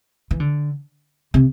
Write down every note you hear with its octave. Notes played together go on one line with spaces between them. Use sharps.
E3
D3
C3